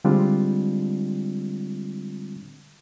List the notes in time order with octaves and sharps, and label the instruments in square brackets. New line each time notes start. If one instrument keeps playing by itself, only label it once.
[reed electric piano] D3 G3 G#3 C4 D4 F4